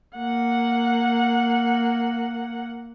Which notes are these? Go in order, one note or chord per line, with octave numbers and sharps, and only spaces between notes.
A#3 F#5